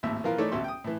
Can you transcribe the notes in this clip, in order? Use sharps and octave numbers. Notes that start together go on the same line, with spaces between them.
G#1 D#2 A2 E5
A#2 E3 F3 A#3 F4 A#4
E3 A3 D#4 A4 C#5 D5
A1 D2 B2 E5 C6
G5 D#6
A2 E3